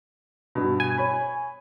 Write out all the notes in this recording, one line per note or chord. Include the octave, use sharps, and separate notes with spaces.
G2 B2
G#5
C#5 B5